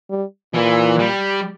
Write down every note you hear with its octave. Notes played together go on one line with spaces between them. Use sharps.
G3
A#2 E3
G3